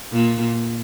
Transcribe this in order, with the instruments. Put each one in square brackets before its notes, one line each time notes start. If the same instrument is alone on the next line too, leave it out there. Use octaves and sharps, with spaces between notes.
[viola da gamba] A#2